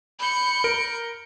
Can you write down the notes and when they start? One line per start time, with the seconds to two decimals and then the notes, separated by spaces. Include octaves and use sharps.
0.20 B5 G6 C#7
0.64 A#4 D7